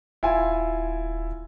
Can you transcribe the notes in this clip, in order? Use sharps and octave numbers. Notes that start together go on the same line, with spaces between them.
D#1 E4 F4 G#5